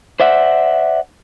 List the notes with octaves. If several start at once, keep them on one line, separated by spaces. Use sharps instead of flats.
C5 D5 E5 F#5